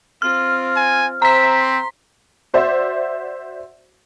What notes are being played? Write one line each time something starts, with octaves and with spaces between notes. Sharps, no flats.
C4 F4 F6
G#5
C4 C5 E5 A#5 B6
C6
F#4 C5 D5 E5